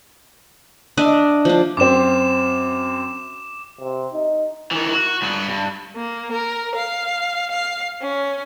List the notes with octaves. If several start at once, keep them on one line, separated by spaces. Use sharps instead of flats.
D4 D#5 E5
F3 D4
F#2 C4 D6 E7
C3
D#4
D#3 E3
F#4
G2 B3
G2
A#3
A#4
F5
F5
C#4